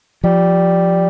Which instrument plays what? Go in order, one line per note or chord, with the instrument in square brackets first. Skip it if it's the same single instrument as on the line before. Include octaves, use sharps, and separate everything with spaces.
[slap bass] F3 [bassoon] G3